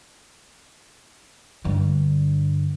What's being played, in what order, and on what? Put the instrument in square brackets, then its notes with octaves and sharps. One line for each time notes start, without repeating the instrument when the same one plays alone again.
[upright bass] G2 D3